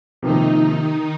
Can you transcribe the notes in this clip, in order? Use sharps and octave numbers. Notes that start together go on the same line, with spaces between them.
C3 D#3 F3 A#3 D#4